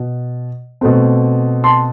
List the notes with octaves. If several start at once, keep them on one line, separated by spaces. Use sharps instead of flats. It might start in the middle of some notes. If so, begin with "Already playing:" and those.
Already playing: B2
B2 A3 C4
A5 C6